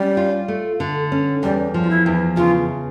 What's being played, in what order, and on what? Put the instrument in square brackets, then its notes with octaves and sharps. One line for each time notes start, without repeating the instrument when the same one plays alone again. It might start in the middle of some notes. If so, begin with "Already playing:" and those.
Already playing: [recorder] G3 [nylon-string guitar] C#4
[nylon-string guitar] F4
A3
D3
C#4
[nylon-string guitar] E2 [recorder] G3
[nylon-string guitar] F3
[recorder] F4
E4
[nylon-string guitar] E2
[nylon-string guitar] C#3 [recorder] F4